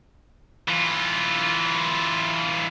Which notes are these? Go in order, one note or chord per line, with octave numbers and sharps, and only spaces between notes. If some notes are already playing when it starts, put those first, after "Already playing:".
E3 F4